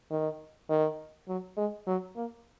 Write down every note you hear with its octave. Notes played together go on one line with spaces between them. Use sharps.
D#3
D#3
F#3
G#3
F#3
A#3